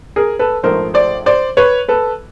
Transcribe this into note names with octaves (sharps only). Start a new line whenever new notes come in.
G#4 A#4
A4 B4
A#1 G#2 F3 A3 A#4 C5
C5 D5
C5 D5
B4 C#5
A4 B4